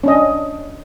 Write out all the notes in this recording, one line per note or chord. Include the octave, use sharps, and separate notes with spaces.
C#4 D4 D#5